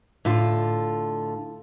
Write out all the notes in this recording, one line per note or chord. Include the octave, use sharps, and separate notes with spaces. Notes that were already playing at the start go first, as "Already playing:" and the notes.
A2 D3 F4